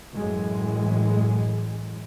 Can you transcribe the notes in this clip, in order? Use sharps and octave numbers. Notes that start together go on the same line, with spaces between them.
F#2 A2 E3 G#3